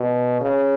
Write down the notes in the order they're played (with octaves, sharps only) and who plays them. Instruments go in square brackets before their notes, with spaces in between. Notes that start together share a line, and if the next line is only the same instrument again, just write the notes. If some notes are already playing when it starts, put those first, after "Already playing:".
Already playing: [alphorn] B2
C#3